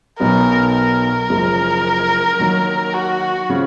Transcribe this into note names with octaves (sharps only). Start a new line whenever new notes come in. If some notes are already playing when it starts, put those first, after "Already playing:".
B1 B2 F#3 B3 D#4 A#4
A#4
F#1 F#2 F3 G#3
D#2 D#3 F#3
F#4
C#3 F3